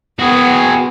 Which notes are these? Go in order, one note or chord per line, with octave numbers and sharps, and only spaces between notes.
B3 F#4 G#4